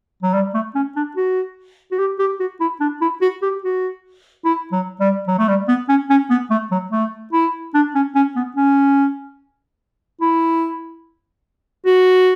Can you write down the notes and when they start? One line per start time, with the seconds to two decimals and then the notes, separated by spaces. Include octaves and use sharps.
0.23 F#3
0.34 G3
0.54 A3
0.75 C#4
0.96 D4
1.17 F#4
1.92 F#4
1.99 G4
2.19 G4
2.40 F#4
2.61 E4
2.80 D4
3.01 E4
3.22 F#4
3.42 G4
3.64 F#4
4.45 E4
4.72 F#3
5.00 G3
5.28 F#3
5.39 A3
5.48 G3
5.68 B3
5.89 C#4
6.10 C#4
6.30 B3
6.51 A3
6.72 F#3
6.92 A3
7.33 E4
7.74 D4
7.95 C#4
8.15 C#4
8.36 B3
8.57 C#4
10.21 E4
11.86 F#4